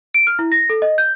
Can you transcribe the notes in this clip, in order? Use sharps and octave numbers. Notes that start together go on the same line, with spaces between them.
D7
F6
E4
A#6
A4
D#5
G6